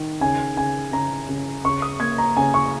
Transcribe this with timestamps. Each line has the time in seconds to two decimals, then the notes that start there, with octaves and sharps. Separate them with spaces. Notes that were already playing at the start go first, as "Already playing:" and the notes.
Already playing: D#3
0.21 C#3 G#5
0.57 C#3 G#5
0.92 C#3 A#5
1.29 C#3
1.65 C#3 C#6
1.82 D#6
2.00 A#3 G#6
2.18 A#5
2.37 C#3 G#5
2.54 C#6